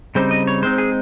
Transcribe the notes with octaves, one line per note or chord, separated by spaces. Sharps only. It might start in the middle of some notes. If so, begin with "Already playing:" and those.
C#3 G3 C4 D#4 C5
D#5
C#5
G#3 C4 D#4 C5
G#4